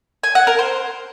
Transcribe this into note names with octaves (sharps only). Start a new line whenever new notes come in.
G#5
F#5
A#4
C5